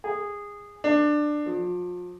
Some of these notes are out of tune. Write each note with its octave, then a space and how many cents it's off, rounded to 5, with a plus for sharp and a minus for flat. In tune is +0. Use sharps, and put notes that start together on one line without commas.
G#4 -20
D4 +15
F3 +35